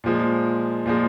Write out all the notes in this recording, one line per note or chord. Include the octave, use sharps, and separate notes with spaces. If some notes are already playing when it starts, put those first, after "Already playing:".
A#2 F3 G#3
A#2 F3 G#3